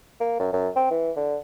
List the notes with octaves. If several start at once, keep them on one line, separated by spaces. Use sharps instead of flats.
A#3
F#2
F#2
C4
E3
D3